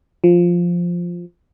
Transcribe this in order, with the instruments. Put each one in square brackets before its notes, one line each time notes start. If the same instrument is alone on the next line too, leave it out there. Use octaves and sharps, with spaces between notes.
[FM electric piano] F3